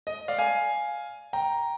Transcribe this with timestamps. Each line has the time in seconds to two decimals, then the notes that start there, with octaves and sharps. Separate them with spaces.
0.07 D#5
0.28 D5 F5
0.38 F5 G#5
1.33 G5 A#5